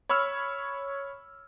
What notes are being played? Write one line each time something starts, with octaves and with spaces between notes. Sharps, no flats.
C#5 B5 C#6 E6 F6